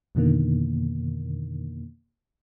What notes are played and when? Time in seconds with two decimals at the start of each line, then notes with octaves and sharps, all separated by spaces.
0.15 F2 B2 D3 D#3 A#3